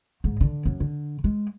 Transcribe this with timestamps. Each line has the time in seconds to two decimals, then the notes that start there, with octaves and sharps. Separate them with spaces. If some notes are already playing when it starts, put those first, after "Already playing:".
0.24 G#2
0.41 D3
0.66 F#2
0.80 D3
1.24 G#3